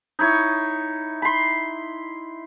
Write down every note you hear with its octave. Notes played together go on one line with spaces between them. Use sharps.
D#4 E4 C#5
B5 C6